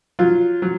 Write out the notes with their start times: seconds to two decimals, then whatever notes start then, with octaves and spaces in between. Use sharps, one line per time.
0.19 F#3 F4
0.62 F#3